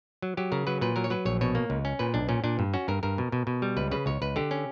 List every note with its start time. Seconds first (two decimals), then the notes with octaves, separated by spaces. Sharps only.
0.22 F#3
0.37 F#3 G4
0.52 C#3 A#4
0.67 F#3 B4
0.81 A#2 B4
0.96 F#3 A#4
1.04 C#5
1.10 F#3 B4
1.25 A#1 C#5
1.41 B2 C#5
1.55 A#3
1.70 C#2
1.85 C#4
1.99 A#2 B4
2.14 B1 D4
2.29 A#2 C#4
2.44 A#2 D4
2.59 G2
2.74 C#4 F#4
2.88 G2 A#4
3.03 G2 A#4
3.18 B2
3.32 B2
3.47 B2
3.62 G3
3.77 C#2 B4
3.91 C#3 B4
4.06 C#2 C#5
4.22 C#2 B4
4.36 D3 G4
4.51 C#4